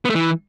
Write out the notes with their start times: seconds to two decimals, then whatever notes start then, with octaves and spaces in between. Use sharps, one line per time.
0.05 B3
0.10 A3
0.15 E3